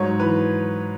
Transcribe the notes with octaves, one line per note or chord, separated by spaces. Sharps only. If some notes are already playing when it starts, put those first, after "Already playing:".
Already playing: G#2 F#3 C#5
E3 B4